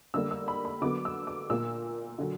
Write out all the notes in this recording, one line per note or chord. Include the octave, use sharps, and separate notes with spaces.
D3 G3 A#3 E6
E6
B5
B5
D3 F#3 B3 D6
E6
D6
A#2 A#3 E6
D3 F#3